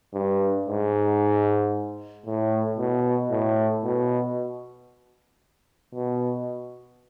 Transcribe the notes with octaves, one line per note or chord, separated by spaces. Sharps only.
G2
G#2
A2
B2
A2
B2
B2